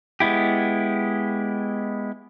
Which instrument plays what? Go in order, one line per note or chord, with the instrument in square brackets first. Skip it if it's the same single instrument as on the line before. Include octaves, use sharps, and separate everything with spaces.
[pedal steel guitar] G#3 B3 E4 G4